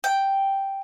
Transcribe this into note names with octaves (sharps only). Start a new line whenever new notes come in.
G5